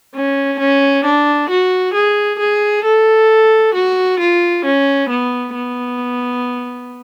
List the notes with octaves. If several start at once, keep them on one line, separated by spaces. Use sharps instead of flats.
C#4
C#4
D4
F#4
G#4
G#4
A4
F#4
F4
C#4
B3
B3